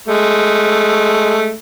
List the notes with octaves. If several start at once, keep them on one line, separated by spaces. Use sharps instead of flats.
G#3 A3